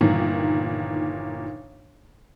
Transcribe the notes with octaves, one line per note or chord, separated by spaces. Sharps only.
G1 A#2 D#3 E3